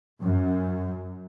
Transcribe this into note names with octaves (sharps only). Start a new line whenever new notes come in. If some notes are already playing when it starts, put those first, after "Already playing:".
F#2